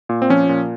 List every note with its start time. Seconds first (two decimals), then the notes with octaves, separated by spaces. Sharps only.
0.09 A#2
0.22 C4
0.30 F3 C#4
0.49 A#2